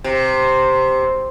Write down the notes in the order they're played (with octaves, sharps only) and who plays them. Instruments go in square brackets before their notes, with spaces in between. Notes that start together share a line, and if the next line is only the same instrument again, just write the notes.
[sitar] C3